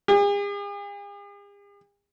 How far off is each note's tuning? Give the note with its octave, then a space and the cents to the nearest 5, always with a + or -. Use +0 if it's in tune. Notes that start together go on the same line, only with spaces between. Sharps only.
G#4 -45